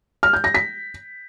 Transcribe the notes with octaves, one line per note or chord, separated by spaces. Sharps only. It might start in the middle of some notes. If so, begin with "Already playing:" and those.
F6
G6
A#6
B6